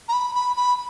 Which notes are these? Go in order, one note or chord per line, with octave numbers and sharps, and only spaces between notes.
A#5
B5
B5
B5